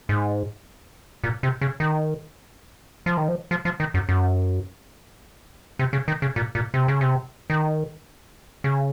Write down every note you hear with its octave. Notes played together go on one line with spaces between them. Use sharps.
G#2
A#2
C3
C#3
D#3
F3
D#3
F3
F3
F3
D#3
F#2
F#2
C3
C#3
D#3
C#3
A#2
A#2
C3
C#3
C3
D#3
C#3